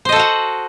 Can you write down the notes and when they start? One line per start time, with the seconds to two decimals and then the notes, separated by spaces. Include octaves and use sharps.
0.05 C5
0.09 D#5
0.12 A4
0.16 F#4
0.20 F#5